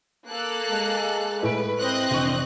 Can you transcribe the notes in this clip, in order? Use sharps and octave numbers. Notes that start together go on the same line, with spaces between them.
A#3 A4 F#6
G#3
A2 B4 D7
C4 D#5 F#6
F1 E3 D4 C#6